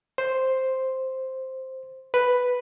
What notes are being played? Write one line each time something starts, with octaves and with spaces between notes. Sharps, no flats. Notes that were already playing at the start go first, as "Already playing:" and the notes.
C5
B4